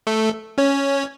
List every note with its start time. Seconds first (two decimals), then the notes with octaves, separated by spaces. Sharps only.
0.07 A3 A4
0.58 C#4 C#5